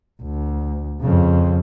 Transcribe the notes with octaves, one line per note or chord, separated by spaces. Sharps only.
D2
F2 C#3